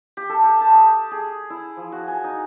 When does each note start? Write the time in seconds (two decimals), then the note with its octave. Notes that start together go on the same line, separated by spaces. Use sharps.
0.17 G4
0.29 A4
0.44 G4
0.61 A5
0.75 D#6
1.11 G#4
1.50 E4
1.77 F3
1.92 F#4
2.08 G#5
2.24 D#4